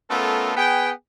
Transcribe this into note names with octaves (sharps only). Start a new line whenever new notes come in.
A3 B3 C#4 F4 A4 A#4
B3 G#4 B4 G5